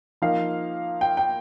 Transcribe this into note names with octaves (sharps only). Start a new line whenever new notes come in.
F3 A#3 D#4 F5
G5
G5